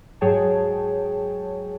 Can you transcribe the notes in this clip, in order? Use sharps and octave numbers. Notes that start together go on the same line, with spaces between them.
G#2 F#3 G#4 C#5 G5 A5